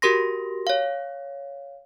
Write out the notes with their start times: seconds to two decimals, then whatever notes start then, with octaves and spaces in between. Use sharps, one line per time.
0.02 F#4 G4 A#4 C6 A#6
0.67 C#5 F5